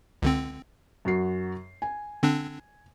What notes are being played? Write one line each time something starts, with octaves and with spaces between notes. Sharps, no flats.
C#2 D3 C4
F#2 F#4 C7
G#5
D3 C4 D4